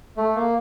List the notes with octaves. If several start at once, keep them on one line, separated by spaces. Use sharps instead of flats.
A3
A#3